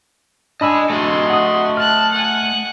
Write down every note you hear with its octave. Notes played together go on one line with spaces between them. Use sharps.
D4 D#5 G#5 B5 E6
A3 F#4 D#5 C6
F#5 D#6
A5 F6 F#6
F#5 G#5